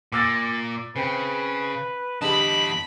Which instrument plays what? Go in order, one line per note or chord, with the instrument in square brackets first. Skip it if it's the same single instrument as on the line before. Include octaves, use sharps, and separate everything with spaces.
[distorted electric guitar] A#2 [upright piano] D6 E6 A6
[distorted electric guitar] C#3 [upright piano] C4 G5 [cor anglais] B4
[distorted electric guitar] E2 A5 [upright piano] D3 G3 [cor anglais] D#5 [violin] B5